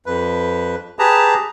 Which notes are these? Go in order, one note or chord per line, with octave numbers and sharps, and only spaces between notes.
F2 B4
G4 G#4 B4 A5 A#5